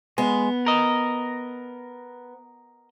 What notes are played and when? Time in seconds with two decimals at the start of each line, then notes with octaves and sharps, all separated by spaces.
0.18 G#3 B3
0.66 A#4 D#5